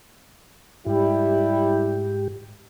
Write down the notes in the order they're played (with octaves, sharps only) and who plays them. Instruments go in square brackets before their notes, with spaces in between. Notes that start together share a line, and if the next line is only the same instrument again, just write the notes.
[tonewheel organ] G#2 G4 [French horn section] G3 E4